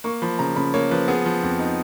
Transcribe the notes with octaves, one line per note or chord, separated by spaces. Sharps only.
A#3 C#6
F3 B5
C#3 A#5
C#3 B5
A#3 C#5
F3 B4
B3 G#4
F3
F2
D#4